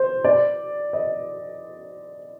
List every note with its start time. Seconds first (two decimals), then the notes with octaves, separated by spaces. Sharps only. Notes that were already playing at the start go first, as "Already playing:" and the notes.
Already playing: C5
0.24 D5
0.93 D#5